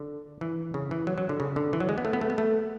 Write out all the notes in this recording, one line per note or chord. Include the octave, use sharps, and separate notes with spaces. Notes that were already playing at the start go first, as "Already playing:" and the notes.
Already playing: D3
E3
C#3
E3
F#3
F#3
D3
C#3
D3
E3
F#3
G#3
B3
A3
B3
A3
B3
A3